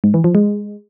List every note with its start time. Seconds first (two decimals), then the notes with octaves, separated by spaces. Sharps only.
0.04 G#2
0.14 E3
0.24 F3
0.35 G#3